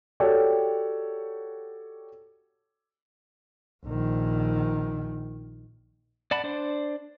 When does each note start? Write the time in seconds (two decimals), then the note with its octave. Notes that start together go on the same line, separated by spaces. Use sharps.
0.20 F#4 G4 A4 C#5 D5 G5
3.85 A#1 D#3
6.31 D5 F#5 A5 B5
6.44 D4 C5 D5